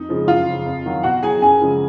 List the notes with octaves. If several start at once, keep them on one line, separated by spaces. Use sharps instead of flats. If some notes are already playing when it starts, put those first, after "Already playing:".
Already playing: F2 D#4
C#3 F3 G#3
F#2 F4 F5
C#3 F3
F2
D#3 F#3
B2 F#4 F#5
F#3 G#4 G#5
F#2 G#4 G#5
C#3 F3 G#3